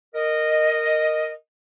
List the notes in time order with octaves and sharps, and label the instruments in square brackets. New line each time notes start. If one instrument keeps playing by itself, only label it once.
[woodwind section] A#4 D#5